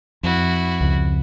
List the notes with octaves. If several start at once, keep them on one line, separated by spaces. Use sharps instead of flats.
F2 E4 F#4
C#2